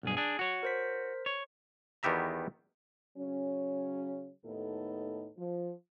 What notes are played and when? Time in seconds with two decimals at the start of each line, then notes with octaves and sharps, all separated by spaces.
0.03 B1 G2 G#4
0.17 D4 G#4
0.39 F#4 C#5
0.63 A#4 C5 B6
1.26 C#5
2.03 E2 D#3 B3 G4 E5 A#5
3.17 C#3 F#3 C#4
4.44 D#2 A2 B3 D#4 A4
5.37 F3